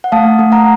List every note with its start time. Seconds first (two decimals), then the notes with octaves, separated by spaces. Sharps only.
0.04 F#5
0.12 A3 F5 A5
0.39 A3
0.52 F#5 A#5